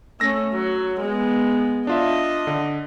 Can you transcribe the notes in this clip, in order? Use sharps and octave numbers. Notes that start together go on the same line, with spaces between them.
A3 C#4 E6 A#6
F#3
G#3 B3
D4 F4 D#5 E5
D3